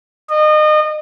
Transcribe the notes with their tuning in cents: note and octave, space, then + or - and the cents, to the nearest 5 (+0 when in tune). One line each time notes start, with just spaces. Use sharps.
D#5 -30